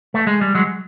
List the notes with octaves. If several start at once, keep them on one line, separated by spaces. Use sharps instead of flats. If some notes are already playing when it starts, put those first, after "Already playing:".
A3
G#3
G3
F#3 G#3